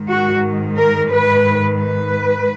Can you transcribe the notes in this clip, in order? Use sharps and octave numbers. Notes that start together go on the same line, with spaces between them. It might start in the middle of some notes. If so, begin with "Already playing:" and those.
Already playing: G#2 D#3
F#4
A#4
B4
B4